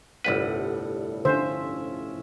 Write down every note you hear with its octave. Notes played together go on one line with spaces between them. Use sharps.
G1 C2 A2 G3 B4 F#5
D3 F3 C#4 C5 E5